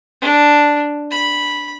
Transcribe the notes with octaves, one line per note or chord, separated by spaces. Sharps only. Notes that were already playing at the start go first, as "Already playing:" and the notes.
D4
B5